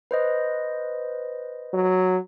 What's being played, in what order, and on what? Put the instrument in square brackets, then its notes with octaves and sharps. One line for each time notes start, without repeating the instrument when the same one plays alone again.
[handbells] B4 C5 D#5
[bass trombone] F#3